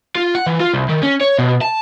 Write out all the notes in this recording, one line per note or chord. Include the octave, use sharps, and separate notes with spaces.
F4
F#5
E3
F4
C2
D#3
C#4
C#5
B2
A5